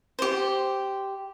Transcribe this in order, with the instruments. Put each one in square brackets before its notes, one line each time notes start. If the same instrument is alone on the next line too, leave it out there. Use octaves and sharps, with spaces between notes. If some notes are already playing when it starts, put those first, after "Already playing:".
[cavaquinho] G4 C5